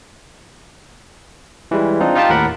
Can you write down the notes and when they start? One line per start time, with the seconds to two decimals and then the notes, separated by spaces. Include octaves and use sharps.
1.71 E3 G3 G#3
2.00 C4 D4 D#4 F4
2.15 D#4 F4 G4 F5 A5 D6
2.29 D#2 A2 A#4 F#5 B5